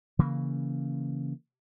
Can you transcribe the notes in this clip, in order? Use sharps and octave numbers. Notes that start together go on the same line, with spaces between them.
C#3 E3 A#3